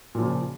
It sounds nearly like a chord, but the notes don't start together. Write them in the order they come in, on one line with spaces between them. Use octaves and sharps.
A#2 F3 C#3